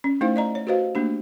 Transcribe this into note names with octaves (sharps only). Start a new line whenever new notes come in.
C#4
A3 D#4 E4 G4 C5 F5
D5 D#5 A#5
C#5
F#4 G4 B4 C5 D#5 F5
A3 A#3 D4 G4